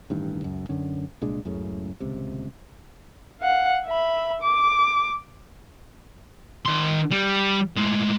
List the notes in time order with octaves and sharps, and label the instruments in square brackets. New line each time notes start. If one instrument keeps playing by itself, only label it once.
[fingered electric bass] A1 G2 D#3
C#2 F#2
F#2 D3 C#4
C2 A#2 G#3 D4
C#2 F#2 A2 C#3
D#1 C#2 C3
[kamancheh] F5 F#5
E5 B5
D6
[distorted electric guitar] D#3 C6
G3
A2 G#3